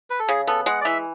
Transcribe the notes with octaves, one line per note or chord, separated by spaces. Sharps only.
B4
A4
C#3 G#4
B3 A4
G#3 F#5
D5
E3 E5